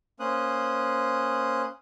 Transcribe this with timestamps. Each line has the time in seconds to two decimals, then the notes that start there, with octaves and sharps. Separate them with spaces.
0.20 A#3 C#4 C5 D#6 F#6